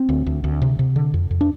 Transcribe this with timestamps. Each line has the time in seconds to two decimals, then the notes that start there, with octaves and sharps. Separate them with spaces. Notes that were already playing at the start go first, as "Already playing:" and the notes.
Already playing: C4
0.09 D2
0.26 D2
0.44 D2
0.62 C3
0.79 C3
0.96 D3
1.14 F2
1.31 F2
1.41 D4